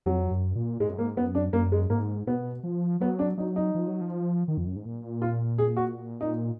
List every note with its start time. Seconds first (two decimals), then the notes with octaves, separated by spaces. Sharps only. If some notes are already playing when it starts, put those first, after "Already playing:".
0.06 F2 F#3
0.31 F#2
0.55 A#2
0.80 G#2 G#3
0.89 F#2
0.98 G#2 A#3
1.17 F#2 B3
1.35 D4
1.53 F#2 A#3
1.72 G#3
1.90 G#2 A#3
2.27 B2 B3
2.63 F3
3.00 F#3 B3
3.19 D4
3.38 F#3 D#4
3.56 D#4
3.75 F3
3.88 F#3
4.01 F3
4.48 D#3
4.57 F2
4.67 F#2
4.76 G#2
4.85 A#2
5.22 F4
5.58 G#4
5.77 F#4
6.21 D#4